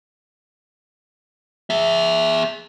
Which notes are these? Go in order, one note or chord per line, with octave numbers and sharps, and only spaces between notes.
G#4 E5